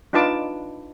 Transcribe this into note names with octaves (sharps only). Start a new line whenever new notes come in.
D4 D#4 F4 B4 A5 D6